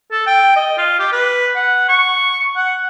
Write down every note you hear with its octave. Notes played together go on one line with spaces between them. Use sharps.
A4
G5
D#5
F4
G4
B4
F#5
C#6
F#5